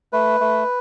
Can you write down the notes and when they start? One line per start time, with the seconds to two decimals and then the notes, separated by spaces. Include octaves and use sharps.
0.13 A3 B4
0.41 A3